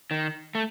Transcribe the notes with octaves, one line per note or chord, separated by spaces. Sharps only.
D#3
A3